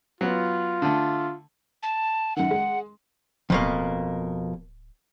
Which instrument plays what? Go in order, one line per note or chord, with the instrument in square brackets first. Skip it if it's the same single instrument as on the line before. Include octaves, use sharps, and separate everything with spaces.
[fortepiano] F#3 B3 [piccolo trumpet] F4
[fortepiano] D3 A3
[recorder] A5
[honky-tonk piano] F#2 D#3 [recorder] F#5
[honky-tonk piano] G#3
[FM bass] D1 [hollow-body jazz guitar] F2 B2 A#3